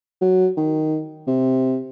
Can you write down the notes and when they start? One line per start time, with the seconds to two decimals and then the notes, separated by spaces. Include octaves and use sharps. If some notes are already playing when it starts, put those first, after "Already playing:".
0.21 F#3
0.57 D#3
1.27 C3